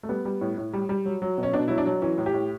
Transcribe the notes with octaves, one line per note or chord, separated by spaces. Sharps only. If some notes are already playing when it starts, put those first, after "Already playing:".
A3
G3 B3
G3
A2
A2
G3
G3
F#3
F#3
B2
C#4
B2 D4
F#3 E4
D4
F#3
E3 C#4
A2
G4
A2